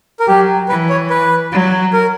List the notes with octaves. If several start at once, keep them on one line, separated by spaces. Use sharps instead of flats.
A#4
F#3 G4
E3 B4
C#5
B4
F#3
A#4